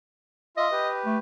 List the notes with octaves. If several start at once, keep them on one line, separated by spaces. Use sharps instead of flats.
F4 D#5 E5
G4 B4
A3